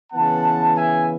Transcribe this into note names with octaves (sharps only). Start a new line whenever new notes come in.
C#3 E3 B3 F#5 A5
E5 G#5